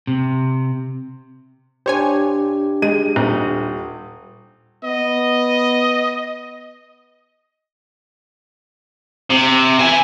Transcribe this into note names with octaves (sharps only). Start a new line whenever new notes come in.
C3
D4 G4 C5 C#5 G#5
G#3 D#7
D#1
B3 D#5
C3
E4 G#5